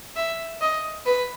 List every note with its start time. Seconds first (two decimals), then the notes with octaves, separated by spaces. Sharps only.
0.16 E5
0.61 D#5
1.06 B4